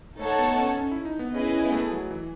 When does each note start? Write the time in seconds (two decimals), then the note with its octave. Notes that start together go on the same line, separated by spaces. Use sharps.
0.19 A3 D#4 A4 C#5 F#5 A5
0.39 B3
0.58 C#4
0.77 C#4
0.91 E4
1.05 D#4
1.19 B3
1.34 C#4 E4 G#4 B4 D#5
1.53 C#4
1.65 B3
1.72 A3
1.91 F#3
2.11 E3